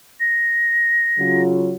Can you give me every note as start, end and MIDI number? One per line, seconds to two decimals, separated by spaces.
0.20 1.42 94
1.19 1.76 49
1.19 1.76 54
1.19 1.76 65